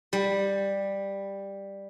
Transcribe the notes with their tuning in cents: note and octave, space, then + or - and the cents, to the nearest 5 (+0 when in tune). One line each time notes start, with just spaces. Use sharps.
G3 +10